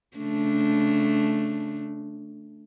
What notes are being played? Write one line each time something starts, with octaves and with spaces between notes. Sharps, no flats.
C#3 A3 D4